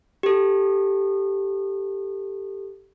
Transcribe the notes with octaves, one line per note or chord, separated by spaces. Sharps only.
G4 A4